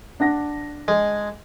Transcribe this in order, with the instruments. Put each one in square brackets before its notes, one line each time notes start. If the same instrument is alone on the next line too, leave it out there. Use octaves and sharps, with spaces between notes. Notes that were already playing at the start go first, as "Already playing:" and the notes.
[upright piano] D4 F#5 A#6
[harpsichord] G#3